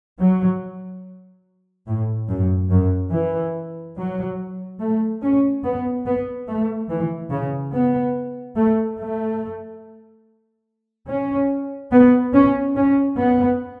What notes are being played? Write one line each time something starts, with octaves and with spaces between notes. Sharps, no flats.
F#3
A2
F#2
F#2
E3
F#3
A3
C#4
B3
B3
A3
E3
C#3
B3
A3
A3
C#4
B3
C#4
C#4
B3